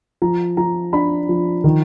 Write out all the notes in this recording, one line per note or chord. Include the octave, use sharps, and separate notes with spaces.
F3 A#5
F3 A#5
D4 B5
F3
D#3